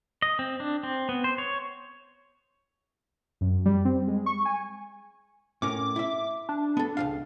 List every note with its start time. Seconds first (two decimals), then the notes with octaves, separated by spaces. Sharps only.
0.22 D#5
0.39 C4
0.60 D4
0.83 C4
1.09 B3
1.24 C5
1.38 C#5
3.41 F#2
3.66 G3
3.85 C4
4.08 G#3
4.26 C#6
4.45 G#5
5.62 A2 C#4 A#4 D6
5.96 E4 E5
6.49 D4
6.77 B3 A4
6.97 C#2 D#3 F5